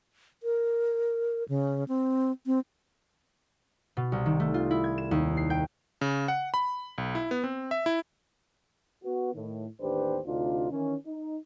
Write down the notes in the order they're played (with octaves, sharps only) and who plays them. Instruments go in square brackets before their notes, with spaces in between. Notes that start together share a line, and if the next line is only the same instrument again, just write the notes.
[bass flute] A#4
C#3
C4
C4
[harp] B2
C2
D#3
A3
F4
E4
G#6
E7
D#2
C7
G5
[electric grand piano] C#3
F#5
B5
B1
E4
B3
C4
E5
E4
[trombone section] B3 F#4
A2 D#3
A1 D#2 D4 G4 B4 C5
D2 C3 D4 D#4 F4
D#3 E3 C#4
D#4